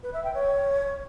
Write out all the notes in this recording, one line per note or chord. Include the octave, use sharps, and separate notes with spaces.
B4
E5
G5
C#5